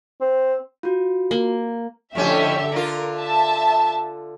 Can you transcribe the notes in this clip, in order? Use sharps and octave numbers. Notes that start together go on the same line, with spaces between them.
C4
F4 F#4
A#3
F2 A2 D3 C#4 G4 E5
D3 F4 A#4
E5 A5